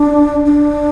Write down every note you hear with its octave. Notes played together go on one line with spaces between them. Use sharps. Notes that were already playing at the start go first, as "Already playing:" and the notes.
Already playing: D4
D4